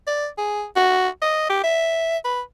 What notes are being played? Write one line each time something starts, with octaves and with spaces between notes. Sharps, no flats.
D5
G#4
F#4
D#5
G4
E5
B4